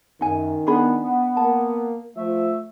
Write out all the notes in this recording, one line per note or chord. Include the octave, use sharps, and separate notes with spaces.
F#2 D#3 D#4 G#5
B3 D4 G#4 B5
B3
A#3 A5
F3 A3 E5